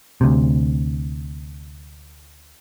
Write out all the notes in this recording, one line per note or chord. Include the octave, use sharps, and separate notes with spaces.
D2 C3